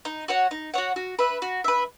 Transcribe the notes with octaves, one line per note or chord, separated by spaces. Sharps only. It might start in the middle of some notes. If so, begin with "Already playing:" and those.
D#4
F#4 C#5 F#5
D#4
F#4 C#5 F#5
F#4
B4 E5
F#4
B4 E5